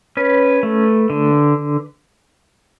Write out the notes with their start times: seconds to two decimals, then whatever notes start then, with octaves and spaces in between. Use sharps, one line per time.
0.17 C#4 B4
0.63 A3
1.10 D3